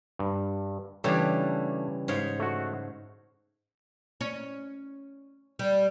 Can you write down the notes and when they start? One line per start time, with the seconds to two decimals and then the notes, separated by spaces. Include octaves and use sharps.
0.19 G2
1.04 C#3 E3 G3 A3 D4
2.08 G#2 C#5 F5
2.40 A3 F#4
4.21 C#4
5.59 G3